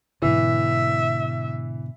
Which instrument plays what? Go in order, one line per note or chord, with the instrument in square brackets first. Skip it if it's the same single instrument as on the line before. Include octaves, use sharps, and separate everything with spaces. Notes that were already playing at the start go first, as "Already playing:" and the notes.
[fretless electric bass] G#2 B2 D3 [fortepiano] E3 [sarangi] E5